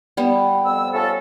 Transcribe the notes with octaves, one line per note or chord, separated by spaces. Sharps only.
G3 B3
F2 E6
C#4 F4 A4